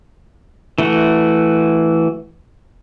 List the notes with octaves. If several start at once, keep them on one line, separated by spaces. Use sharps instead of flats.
E3 A3 F#4